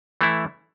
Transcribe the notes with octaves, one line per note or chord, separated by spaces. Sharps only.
E3 A3 E4